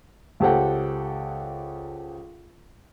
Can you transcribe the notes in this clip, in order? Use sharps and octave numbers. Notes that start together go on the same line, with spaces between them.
C#2 G4 A4 C5 F#5 G5